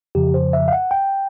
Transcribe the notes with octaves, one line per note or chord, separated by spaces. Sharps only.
F2 C#3 F3 G4
C5
E5
F5
F#5
G5